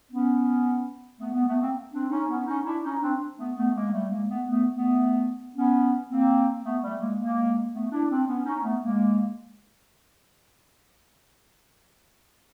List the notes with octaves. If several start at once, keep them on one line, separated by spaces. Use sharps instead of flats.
B3 C#4
A3 B3
A3 B3
A3 B3
A#3 C4
C4 D4
C#4 D#4
B3 C#4
C#4 D#4
D4 E4
C#4 D#4
C4 D4
A3 B3
A3 B3
G#3 A#3
G3 A3
G#3 A#3
A3 B3
A3 B3
A3 B3
B3 C#4
A#3 C4
A3 B3
G3 A3
G#3 A#3
G#3 A#3
A3 B3
D4 E4
C4 D4
B3 C#4
C#4 D#4
A3 B3
G#3 A#3